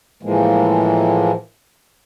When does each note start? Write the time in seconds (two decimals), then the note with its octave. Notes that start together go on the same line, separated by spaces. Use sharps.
0.23 A2 E3 F3 G#3 A#3